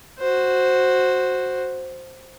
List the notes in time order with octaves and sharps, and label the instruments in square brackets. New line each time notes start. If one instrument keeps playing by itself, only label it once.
[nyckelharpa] F#4 C5